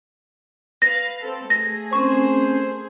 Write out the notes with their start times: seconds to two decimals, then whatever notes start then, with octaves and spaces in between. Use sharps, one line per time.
0.82 B4 F5 A#6
1.22 C4 A4
1.50 A3 G#4 A#6
1.93 C4 C#4 A#4 C5 C#6